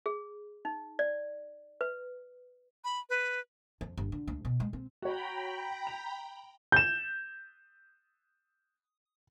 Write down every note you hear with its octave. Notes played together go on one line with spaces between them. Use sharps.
G#4
D#4
D5
B4
B5
B4
F2
G1
D3
D2
B2
G#3
C4
F#4 C#5 G5 A#5 B5
F7
G6 E7